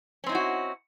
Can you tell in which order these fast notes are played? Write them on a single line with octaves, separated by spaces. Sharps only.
C#4 C4 D#4 E4 F#4